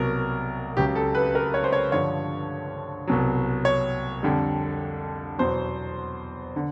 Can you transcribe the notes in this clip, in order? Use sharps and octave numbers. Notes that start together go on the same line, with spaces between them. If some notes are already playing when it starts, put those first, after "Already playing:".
Already playing: C2 B2 F#3 A#4
C#2 C#3 F#3 G4
A4
B4
A#4
C#5
C5
C#5
G2 D3 F3 C#5
C2 B2 F#3
C#5
F2 D3 G3
E2 B2 F#3 C5
D3